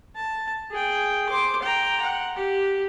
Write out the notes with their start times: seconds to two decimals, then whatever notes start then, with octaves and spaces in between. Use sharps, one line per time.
0.16 A5
0.71 G#4 G5
1.29 C5 D6
1.63 G5 A#5
2.02 F#5
2.36 G4